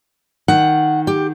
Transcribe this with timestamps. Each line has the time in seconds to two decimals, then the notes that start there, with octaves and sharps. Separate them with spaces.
0.48 D#3 F#5
1.07 G4